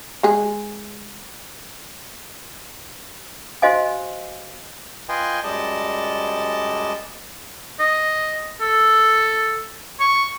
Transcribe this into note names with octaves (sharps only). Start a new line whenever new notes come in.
G#3 G#4
F#4 C5 D#5 F5 G#5
F4 B4 D#5 G5 G#5 C6
F#2 G3 G#3 D5 D#5 A5
D#5
A4
C#6